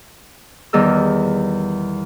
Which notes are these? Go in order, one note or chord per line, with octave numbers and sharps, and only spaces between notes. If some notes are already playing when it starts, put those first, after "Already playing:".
E2 D#3 G3 G#4 D#5 E6